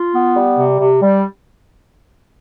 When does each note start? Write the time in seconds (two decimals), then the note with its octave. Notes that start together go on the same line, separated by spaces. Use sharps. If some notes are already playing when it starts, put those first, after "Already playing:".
Already playing: F4
0.13 B3
0.35 G3
0.57 C3
0.80 C3
1.02 G3